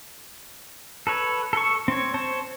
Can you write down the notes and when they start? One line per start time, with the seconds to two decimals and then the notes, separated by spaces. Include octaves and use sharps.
1.07 A4 B4 C#5
1.53 A4 C#6
1.88 C4 C#5
2.14 C5 C#5 A5